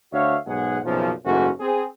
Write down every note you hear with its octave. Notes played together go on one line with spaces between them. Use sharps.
D2 D4 F#4 C#5 E5 F5
B1 G#2 G#4 F#5
B1 F#2 A#2 C#3 F3
F#1 G#2 E3 A3 C#4 F#4
C4 G#4